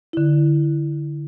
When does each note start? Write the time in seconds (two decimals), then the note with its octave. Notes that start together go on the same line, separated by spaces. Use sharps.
0.13 D3 E4